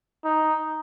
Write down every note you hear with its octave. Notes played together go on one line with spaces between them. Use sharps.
D#4